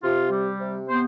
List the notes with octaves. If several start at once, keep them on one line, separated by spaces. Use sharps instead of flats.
C3 F4
G3
C3
B3 C5